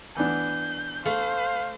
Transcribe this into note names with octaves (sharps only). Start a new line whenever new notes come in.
E3 B3 D4 G6
A3 C5 F5